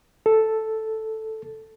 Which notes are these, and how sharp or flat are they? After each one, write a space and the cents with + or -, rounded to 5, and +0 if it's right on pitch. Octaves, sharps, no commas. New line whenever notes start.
A4 +0